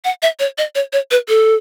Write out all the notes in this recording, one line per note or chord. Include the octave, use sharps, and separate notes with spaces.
F#5
E5
C#5
D#5
C#5
C#5
B4
A4